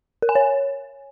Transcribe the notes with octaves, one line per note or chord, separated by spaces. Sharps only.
A#4
G#5
C#5